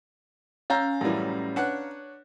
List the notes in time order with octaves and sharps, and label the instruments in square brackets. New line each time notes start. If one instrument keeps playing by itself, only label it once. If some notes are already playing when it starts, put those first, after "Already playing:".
[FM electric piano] C#4 [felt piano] F5 A#5 [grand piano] E6 G6 A6
[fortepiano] F#2 E3 [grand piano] A2 G3
[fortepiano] D4 B4 F#5 [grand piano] C#5